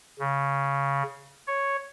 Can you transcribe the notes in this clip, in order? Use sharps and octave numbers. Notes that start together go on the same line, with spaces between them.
C#3
C#5